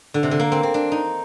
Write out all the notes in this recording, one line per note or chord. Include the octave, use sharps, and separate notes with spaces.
D3
C3
D3
A#3
C4
C4
D4
D#4